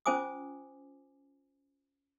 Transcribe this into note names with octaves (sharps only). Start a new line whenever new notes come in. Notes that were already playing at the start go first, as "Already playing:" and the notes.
C#4 F4 C5 G#5 D6 D#6